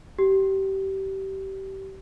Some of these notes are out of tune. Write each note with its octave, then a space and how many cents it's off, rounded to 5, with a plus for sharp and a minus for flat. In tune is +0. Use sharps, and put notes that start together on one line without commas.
G4 -25